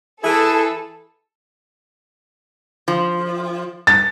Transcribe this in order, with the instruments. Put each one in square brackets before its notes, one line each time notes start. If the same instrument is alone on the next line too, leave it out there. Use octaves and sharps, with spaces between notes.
[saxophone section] E3 E4 G#4 [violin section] A4
[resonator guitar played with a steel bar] F3
[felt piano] A6